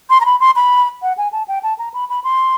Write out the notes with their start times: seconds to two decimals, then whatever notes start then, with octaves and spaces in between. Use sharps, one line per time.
0.10 C6
0.21 A#5
0.26 B5
0.40 C6
0.56 B5
1.02 F#5
1.18 G#5
1.32 A5
1.48 G5
1.63 A5
1.79 A#5
1.94 B5
2.09 B5
2.24 C6